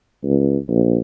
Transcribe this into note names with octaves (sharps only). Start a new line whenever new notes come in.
C#2
A#1